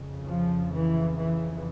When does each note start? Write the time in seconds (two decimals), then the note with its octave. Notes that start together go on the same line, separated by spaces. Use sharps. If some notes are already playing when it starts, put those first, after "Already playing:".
Already playing: F2 C#3
0.26 F3
0.72 E3
1.18 E3